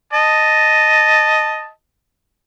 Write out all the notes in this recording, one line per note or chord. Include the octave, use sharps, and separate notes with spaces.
D#5 A5